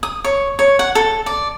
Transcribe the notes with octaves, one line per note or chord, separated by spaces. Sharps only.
D#6
C#5
C#5
F#5
A4
D5